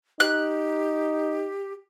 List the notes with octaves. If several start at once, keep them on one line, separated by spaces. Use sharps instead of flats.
D#4 G4 F#6